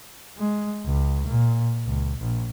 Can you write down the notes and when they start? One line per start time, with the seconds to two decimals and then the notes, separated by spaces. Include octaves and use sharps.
0.38 G#3
0.86 C#2
1.27 A#2
1.87 C#2
2.19 A#1